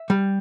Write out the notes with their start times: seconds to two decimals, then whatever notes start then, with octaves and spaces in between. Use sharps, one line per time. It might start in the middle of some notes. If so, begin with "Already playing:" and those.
Already playing: E5
0.10 G3